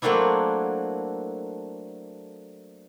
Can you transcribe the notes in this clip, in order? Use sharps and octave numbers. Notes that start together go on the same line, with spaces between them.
F#3 A3 A#3 C4 D4 E4